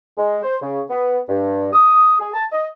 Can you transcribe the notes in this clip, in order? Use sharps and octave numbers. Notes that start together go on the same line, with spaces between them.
G#3
C5
C#3
B3
G2
D#6
G#4
A5
D#5